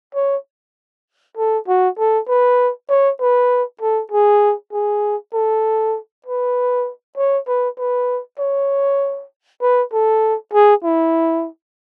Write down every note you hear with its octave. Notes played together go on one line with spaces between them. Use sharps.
C#5
A4
F#4
A4
B4
C#5
B4
A4
G#4
G#4
A4
B4
C#5
B4
B4
C#5
B4
A4
G#4
E4